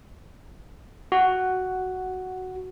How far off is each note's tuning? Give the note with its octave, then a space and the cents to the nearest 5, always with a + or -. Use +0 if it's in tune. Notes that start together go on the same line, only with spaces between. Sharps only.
F#4 +5